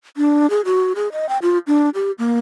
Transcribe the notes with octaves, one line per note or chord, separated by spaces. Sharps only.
D4
G#4
F#4
G#4
D#5
G5
F4
D4
G4
A#3